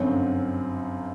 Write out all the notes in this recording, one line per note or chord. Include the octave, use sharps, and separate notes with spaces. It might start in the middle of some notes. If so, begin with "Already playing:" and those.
Already playing: G1 F#2 F#3 C4